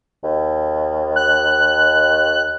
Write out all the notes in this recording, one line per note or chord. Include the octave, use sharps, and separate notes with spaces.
D#2
F#6